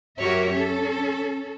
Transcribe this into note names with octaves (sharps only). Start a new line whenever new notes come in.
F#2 F#4 G4 A#4 C#5 E5
C#4 A4